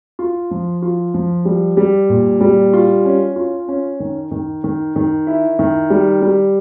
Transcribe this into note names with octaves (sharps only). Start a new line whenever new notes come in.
F4
F3
F4
F3
G3
G3
A#2
G3
F4
C#4
F4
C#4
D#3
D#3
D#3
D#3
E4
D#3
G3
G3